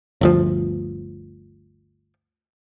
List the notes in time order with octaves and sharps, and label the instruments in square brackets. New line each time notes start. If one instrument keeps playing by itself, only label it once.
[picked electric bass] G1 D2 F3